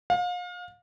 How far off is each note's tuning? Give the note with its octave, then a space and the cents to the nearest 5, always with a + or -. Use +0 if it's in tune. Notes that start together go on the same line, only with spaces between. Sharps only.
F5 +35